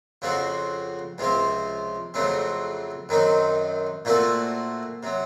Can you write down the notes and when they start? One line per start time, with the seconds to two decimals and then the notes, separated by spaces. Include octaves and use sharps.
0.22 F2 C#3 F3 C4 F#4
1.18 C#2 C3 F3 C4
2.14 F2 C#3 F#3 A3 C4
3.09 F#2 D#3 F#3 C4 D#4
4.05 A#2 A3 C4 F#4 A4
5.03 C3 F#3